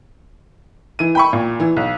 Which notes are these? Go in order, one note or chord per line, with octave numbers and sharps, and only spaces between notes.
E3 D#7
G5 B5 C#6
A#2
E3
B1